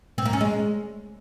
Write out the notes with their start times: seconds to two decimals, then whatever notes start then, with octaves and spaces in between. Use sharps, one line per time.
0.18 C4
0.25 A#3
0.33 C#4
0.41 G#3